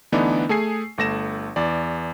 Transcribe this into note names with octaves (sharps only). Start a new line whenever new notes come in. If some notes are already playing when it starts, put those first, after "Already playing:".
D3 E3 A3 B3 D4 D#4
A3 G#4 G#5 C7
G1 A3 A#6 E7
E2 D5